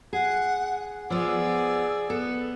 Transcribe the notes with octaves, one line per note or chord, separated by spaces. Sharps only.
G#4 F#5
F3 B3 G#4 D5 E6
B3 A4